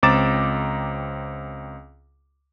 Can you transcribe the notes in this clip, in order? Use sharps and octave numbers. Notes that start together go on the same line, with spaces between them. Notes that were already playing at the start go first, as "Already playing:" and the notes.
C#2 C4 A#5 D6 A6 E7